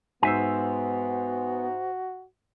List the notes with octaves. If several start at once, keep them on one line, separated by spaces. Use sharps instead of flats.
G#2 B3 F#4 C5 E5 G#5 E6